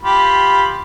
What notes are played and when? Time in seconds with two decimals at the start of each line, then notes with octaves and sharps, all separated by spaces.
0.03 F4 G4 B5